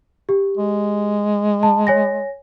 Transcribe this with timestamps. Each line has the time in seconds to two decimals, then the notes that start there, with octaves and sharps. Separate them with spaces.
0.29 G4
0.57 G#3
1.63 A5
1.87 C#5 G#5 A#6